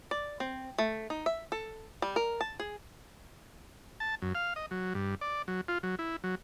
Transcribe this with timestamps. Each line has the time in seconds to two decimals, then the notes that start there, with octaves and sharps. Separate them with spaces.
0.11 D5
0.40 C4
0.78 A3
1.10 D#4
1.26 E5
1.52 A4
2.02 G3
2.16 A#4
2.41 A5
2.60 G#4
4.00 A5
4.22 F#2
4.35 F5
4.56 D#5
4.71 F#3
4.95 G2
5.21 D5
5.48 F#3
5.68 F4
5.83 F#3
5.99 E4
6.24 F#3